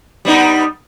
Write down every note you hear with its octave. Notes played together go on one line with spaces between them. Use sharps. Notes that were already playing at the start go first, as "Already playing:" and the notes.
G3 B3 D#4